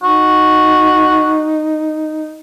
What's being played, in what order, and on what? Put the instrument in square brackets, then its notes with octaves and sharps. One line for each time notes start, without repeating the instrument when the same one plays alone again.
[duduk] D#4 [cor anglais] F#4